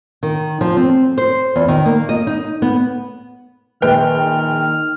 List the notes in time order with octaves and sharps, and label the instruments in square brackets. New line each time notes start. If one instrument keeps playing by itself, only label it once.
[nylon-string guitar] D#3
F3
C4
C5
E2
D#3
A#3
D#5
D#4
B3
[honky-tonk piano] A#1 G5 [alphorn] D#3 [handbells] B4 [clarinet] F6